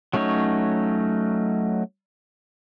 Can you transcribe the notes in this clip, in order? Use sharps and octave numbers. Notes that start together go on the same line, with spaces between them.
F#3 A3 C#4 D#4 C#5